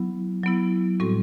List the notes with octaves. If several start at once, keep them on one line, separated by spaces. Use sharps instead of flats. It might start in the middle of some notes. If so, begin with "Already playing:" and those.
Already playing: F#3 B3 E4
F#3 B3 E4
A2 G3 C4 F#4 A4